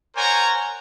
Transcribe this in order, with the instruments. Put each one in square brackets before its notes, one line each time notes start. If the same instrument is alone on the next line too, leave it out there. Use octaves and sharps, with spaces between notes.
[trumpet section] A#4 C5 C#5 F#5 G#5 A#5